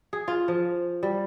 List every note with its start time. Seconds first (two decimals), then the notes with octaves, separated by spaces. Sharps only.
0.13 G#4
0.28 F4
0.48 F3
1.03 G3